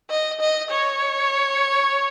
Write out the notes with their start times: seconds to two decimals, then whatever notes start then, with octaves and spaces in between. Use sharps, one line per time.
0.10 D#5
0.41 D#5
0.70 C#5